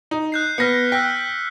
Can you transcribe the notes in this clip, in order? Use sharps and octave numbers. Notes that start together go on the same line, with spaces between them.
D#4
F#6 G6 C7
B3 F6 A#6 B6 C#7
G5 E6 F#6 B6